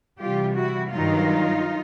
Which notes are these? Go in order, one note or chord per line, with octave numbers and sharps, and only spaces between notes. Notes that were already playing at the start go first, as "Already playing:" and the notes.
C3 E3 G3 F4 G4
E4 F#4
G2 D#3 F#3 D#4 F4